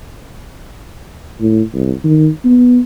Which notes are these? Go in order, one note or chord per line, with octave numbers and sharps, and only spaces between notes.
A2
C2
D#3
B3